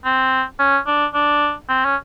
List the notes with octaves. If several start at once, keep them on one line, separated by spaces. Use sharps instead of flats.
C4
C#4
D4
D4
C4
C#4